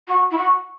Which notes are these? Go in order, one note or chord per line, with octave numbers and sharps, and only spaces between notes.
F#4
E4
F#4